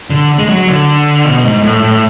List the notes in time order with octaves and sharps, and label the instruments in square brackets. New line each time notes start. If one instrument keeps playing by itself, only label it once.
[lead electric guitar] D3
G#3
F#3
D3
B2
G#2
A2
A2